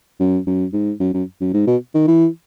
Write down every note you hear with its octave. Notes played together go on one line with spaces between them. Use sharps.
F#2
F#2
G#2
F#2
F#2
F#2
G#2
B2
D#3
E3